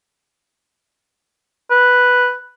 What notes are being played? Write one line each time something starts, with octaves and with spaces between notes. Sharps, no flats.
B4